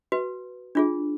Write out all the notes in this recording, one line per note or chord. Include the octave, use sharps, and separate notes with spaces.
F#4 B4
D4 F4 G#4